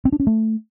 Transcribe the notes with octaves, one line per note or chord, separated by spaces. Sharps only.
C4
D4
C#4
A3